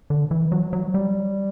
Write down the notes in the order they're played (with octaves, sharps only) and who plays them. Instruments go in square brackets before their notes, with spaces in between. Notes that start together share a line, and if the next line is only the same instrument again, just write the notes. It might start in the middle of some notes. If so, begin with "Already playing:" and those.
[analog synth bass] D3
E3
F#3
F#3
G3